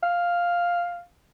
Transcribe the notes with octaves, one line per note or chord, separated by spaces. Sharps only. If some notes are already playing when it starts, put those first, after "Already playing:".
F5